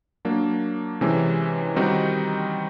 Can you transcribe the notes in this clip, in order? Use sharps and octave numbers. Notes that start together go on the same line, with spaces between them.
F#3 A#3 D4
C3 E3 G#3 C#4
D#3 G3 C4 D#4 F#4